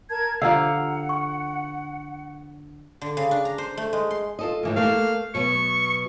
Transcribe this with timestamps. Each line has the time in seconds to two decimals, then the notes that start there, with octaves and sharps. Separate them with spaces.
0.10 A#4 A5 G#6
0.42 D3 F3 G4 F5 F#5 A#5 E6
1.09 C#6
3.01 D3
3.17 C#3
3.31 D4
3.45 A#5
3.58 C5
3.77 A3
3.93 G#3
4.11 C6
4.39 F4 A4 D#5
4.63 A2 E3 A#3
4.76 A3 A#3 A4 F5
5.35 B2 F#3 B3 C#6